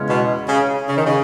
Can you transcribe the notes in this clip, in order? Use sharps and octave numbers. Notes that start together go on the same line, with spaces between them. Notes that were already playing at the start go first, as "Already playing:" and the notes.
Already playing: E2 C#3 G#3 C#4
B2
C#3
C#3
D#3
C#3